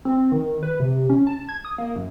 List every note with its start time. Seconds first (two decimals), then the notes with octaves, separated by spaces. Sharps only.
0.05 C4
0.32 D#3
0.63 B4
0.80 C3
1.10 C#4
1.27 A5
1.49 G#6
1.65 D#6
1.78 A#3
1.96 F#2